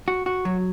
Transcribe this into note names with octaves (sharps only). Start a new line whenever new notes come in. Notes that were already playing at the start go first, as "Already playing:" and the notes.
F#4
F#4
F#3